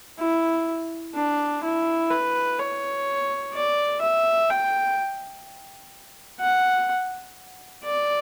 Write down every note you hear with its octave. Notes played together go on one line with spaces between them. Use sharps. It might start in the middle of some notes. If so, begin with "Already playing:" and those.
E4
D4
E4
B4
C#5
D5
E5
G5
F#5
D5